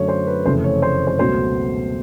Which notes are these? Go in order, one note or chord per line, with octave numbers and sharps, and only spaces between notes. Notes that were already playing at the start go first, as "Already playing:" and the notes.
Already playing: F#2 D3 F#3 A3 C#5
C5
B4
F1 F2 C#3 E3 A3 C5
C#5
C5
C5
C#2 B2 F#3 A3 C5